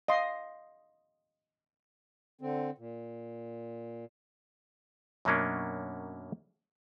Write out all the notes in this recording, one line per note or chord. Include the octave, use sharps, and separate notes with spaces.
D#5 F5 C6
D3 C4
A#2
F#2 B2 F#3 A#3 C#4 D4